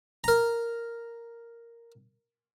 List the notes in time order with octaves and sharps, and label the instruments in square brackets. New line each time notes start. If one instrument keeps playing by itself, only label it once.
[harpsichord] A#4 A#5